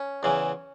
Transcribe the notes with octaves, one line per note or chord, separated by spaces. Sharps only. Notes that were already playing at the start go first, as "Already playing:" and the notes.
Already playing: C#4
E2 C#3 E3